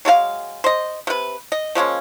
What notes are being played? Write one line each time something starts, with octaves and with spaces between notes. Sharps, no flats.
F#3 G#3 A4 F5
C5 D#5
C3 B4
D#5
F3 G#3 A#3 C#4